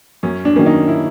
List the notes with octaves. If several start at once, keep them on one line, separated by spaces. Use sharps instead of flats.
F#2 C#4
D4
D#3 F#3 A#3 C#4
D#4
E4